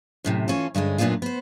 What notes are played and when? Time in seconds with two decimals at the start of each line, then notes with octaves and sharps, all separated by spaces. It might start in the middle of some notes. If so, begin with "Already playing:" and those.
0.25 F#2 A2 C3
0.48 E3 C#4 F4 A4
0.75 G2 D3 G#3 C#4
0.98 F#2 A#2 C#3 B3 D4 F4
1.22 B3 C5